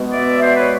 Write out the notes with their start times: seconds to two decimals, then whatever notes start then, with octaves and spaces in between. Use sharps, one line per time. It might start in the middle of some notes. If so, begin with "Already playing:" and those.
Already playing: B2 G#3 B3
0.12 D5 E5
0.42 C5 D5
0.57 B4 C#5